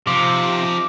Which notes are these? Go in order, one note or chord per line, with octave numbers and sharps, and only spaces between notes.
C3 F3 D#4 G4 D6